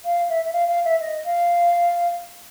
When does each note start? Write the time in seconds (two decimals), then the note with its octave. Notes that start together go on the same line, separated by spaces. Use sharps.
0.05 F5
0.29 E5
0.45 E5
0.53 F5
0.69 F5
0.85 E5
1.01 D#5
1.25 F5